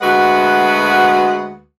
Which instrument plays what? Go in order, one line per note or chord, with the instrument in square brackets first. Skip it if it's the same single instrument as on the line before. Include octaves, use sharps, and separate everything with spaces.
[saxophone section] D2 G#3 F#4 B4 F#5